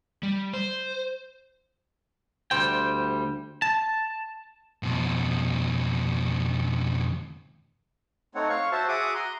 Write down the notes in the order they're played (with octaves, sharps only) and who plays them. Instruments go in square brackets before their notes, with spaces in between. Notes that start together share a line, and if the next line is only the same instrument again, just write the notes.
[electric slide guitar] G3
C5
[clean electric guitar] D2 G3 C5 G5
A5
[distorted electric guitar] F2 B2
[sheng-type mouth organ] A3 C4 D#4 C#5 F#5
C#5 F5 C#6
F#4 C5 E5 A5
F#4 G#4 E5 F#5 D6 D#6
A#5 C6